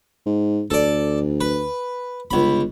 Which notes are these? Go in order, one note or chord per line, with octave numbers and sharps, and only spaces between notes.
G#2
D2 A4 D5
B4
G1 C#2 B5